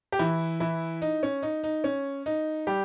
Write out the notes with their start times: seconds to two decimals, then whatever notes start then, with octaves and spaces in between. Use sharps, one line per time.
0.12 G4
0.19 E3 E4
0.60 E3 E4
1.02 D#4
1.23 C#4
1.43 D#4
1.63 D#4
1.84 C#4
2.26 D#4
2.67 G3 G4